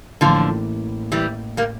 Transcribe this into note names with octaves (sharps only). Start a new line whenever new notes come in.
A1 A2 D3 E3 F3 A#3
E3 G3
G3 A#3